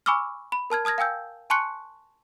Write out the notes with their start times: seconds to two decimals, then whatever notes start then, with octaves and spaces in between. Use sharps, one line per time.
0.06 G#5 B5 C#6 D6 E6 F6
0.52 B5
0.70 A#4 A5 F6 G#6
0.85 A5 D#6 F6 G#6 A#6
0.98 F5 G5 G#5 E6 G6
1.50 G#5 A5 C6 C#6 F#6 C#7